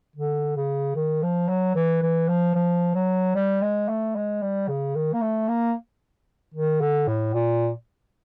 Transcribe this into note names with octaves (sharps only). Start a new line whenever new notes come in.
D3
C#3
D#3
F3
F#3
E3
E3
F3
F3
F#3
G3
G#3
A3
G#3
G3
C#3
D#3
A#3
A3
A#3
D#3
D3
A2
A#2